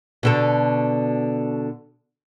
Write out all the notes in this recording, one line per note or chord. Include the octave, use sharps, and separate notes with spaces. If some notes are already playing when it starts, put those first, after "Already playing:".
B2 D3 A4